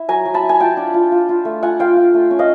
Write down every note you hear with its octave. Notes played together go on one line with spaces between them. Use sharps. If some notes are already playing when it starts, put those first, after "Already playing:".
Already playing: E4
F#3 G#5 A#5
F#3
A5 B5
E4
G#5
F4 G5 A5
D4
F4
F4
F4
A3
F4 F#5 G#5
F4 F5 G5
F4
A3
C#4
D#5 F5